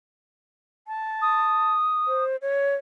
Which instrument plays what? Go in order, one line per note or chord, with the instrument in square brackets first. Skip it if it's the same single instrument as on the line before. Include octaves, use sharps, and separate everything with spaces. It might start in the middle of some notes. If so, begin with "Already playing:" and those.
[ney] A5
[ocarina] D#6
[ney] C5
C#5